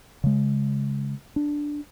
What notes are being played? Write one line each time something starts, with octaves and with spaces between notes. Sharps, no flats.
C#3 G#3
D4